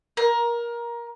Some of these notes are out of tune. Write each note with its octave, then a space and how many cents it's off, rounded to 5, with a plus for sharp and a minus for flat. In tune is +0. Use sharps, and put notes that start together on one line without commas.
A#4 +20